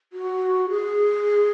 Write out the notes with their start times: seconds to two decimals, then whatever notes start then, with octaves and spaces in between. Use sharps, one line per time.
0.13 F#4
0.70 G#4